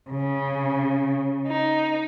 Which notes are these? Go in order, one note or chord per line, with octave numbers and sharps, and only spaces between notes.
C#3
D#4